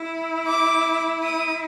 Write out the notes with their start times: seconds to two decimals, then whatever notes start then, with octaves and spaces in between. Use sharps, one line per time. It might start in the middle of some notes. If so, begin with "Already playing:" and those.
Already playing: E4
0.47 D6
1.23 D#6